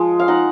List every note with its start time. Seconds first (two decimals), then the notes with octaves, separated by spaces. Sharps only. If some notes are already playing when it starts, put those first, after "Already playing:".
Already playing: F3 G#3
0.19 F5
0.28 D#4 F#5